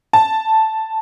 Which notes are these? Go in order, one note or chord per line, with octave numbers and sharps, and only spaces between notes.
A5